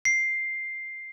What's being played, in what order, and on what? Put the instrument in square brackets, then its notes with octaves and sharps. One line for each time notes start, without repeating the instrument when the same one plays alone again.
[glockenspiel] C7